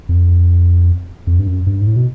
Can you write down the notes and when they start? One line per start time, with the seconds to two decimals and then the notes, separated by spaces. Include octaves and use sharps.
0.09 F2
1.27 F2
1.39 G2
1.47 F#2
1.67 G2
1.81 G#2
1.87 A2
1.96 B2